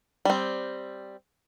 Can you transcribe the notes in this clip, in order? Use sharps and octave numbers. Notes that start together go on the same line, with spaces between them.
G3 C4